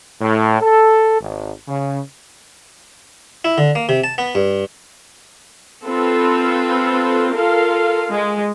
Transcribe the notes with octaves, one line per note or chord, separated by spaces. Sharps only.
A2
A4
G#1
C#3
E4
D3
A#3
C3
A5
B3
G2
C4 F4 A4 B4
F4 A4 A#4 F5
G#3